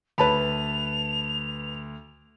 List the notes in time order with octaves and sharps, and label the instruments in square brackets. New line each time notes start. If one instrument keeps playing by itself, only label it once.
[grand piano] D2 [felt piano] B4 A5 B5 [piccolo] F7